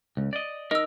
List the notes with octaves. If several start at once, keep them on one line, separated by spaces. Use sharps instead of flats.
C#2
D5 D#5
D#4 A#4 D#5 E6